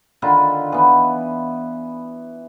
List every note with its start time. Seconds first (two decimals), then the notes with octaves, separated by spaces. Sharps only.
0.22 D3 D#3 F4 B5
0.72 E3 B3